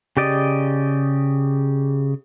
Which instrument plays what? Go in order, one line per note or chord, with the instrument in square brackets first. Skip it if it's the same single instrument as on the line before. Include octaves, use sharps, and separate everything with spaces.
[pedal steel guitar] C#3 G4 D5 D#5